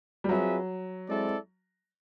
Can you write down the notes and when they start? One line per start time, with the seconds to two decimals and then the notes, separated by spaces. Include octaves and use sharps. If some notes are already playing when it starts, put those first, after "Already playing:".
0.24 G3
0.29 F#3 C4 F4 G#4 B4 E5
1.08 G#3 C4 E4 A4 D5